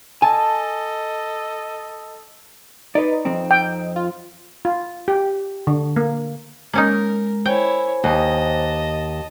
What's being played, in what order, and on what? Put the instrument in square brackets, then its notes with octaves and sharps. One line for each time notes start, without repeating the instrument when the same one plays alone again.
[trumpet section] A4 D#5 [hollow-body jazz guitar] G#5 [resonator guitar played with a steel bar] A5
[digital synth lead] D#4 [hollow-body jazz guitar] B4 D5
[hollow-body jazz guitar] F2 C4
[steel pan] G5
[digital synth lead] F4
[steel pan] F4
G4
D3
A#3
[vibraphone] G#3 [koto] A#3 C#4 D#4 [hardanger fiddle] A#4
[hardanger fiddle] E4 C#5 [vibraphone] C5 G#5 [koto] G5
[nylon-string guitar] D#2 [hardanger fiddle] D#5 A5